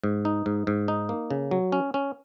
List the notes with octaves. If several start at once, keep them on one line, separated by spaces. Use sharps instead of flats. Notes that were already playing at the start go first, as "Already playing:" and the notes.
G#2
D#4
G#2
G#2
D#4
A#3
C#3
F#3
C#4
C#4